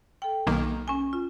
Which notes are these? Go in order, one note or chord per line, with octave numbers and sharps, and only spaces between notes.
A4 G5
B1 D#3 A#3
C#4 G#5
F4